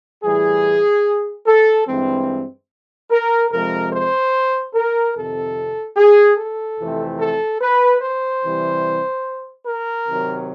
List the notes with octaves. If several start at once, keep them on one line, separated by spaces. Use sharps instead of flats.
A2 E3 G3 G#4
A4
G2 E3 G#3 C4
A#4
F2 C3 F3 G#3 A#4
C5
A#4
F2 C3 D#3 A4
G#4
A4
F2 C3 E3 A3 C4
A4
B4
C5
C3 E3 G3
A#4
C3 D#3 F#3